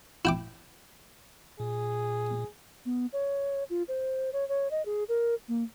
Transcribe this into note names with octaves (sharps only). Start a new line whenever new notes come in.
E4 G5 D6
A#2 G#4
B3
C#5
F4
C5
C#5
C#5
D#5
G#4
A#4
A#3